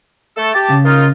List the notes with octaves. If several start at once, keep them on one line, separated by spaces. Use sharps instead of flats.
A3 A4
G4 A5
C#3
A#3 D#4 F4